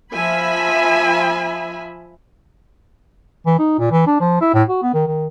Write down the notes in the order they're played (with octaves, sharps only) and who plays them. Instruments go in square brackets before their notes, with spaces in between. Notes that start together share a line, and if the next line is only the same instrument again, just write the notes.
[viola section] F3 E5 G#5 B5
[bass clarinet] E3
D#4
A#2
E3
D4
F3
E4
A2
F#4
B3
D#3
D#3